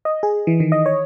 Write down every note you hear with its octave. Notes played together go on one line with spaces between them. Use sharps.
D#5
G#4
E3
D#3
D#5
C#5